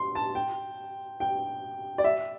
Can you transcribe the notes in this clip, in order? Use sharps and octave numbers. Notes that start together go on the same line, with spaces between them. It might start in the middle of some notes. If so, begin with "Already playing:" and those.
Already playing: C6
A5
G5
G5
D5
E5